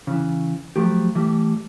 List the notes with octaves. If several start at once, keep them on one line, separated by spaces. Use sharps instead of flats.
C#3 E3
F3 F#3 A3 G4
E3 G3 A3